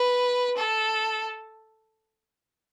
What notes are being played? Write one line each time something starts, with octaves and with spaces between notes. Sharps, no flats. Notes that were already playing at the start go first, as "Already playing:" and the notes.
Already playing: B4
A4